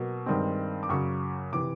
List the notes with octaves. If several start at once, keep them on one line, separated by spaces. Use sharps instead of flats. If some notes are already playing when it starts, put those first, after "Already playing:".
Already playing: B2 F#3 A#3
G2 D#3 G#3 C4
D6
F#2 C#3 F#3 C#6
C3 E3 D6